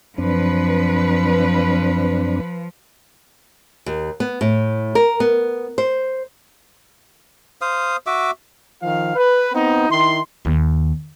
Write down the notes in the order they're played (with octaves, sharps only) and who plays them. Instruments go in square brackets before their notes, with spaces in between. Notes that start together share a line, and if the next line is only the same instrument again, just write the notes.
[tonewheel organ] F#2 C4 D4 [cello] F3 [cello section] B4
[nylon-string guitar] D#2
B3
A2
A#4
B3
C5
[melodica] C5 F5 D#6
F#4 E5 D6
[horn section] D#3 F3 F5
B4
B3 C4 D#4
D#3 E4 C6
[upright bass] D#2